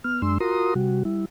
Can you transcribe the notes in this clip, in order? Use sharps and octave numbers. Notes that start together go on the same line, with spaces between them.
B3 F6
F#2 G#3 D4 C6 E6
F4 F#4 A#4 A#5 C6 D#6
C3 G3 F#4
G3 E4